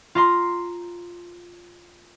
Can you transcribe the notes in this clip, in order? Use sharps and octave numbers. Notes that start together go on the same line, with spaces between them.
F4 A#5 C6